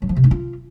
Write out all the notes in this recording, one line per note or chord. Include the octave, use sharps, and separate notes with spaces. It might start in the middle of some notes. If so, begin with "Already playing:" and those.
F#3
F3
C3
D#4
F4